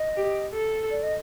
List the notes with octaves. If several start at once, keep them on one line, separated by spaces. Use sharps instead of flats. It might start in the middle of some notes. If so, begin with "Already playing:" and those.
Already playing: D#5
G4
A4
D5
D#5